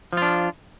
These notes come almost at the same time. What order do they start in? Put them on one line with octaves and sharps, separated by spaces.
F3 F4 D4